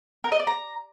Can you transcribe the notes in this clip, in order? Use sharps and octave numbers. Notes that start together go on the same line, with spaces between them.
A#4
D#5
D5
A#5